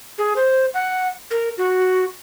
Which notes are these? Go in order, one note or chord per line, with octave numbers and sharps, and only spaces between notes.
G#4
C5
F#5
A#4
F#4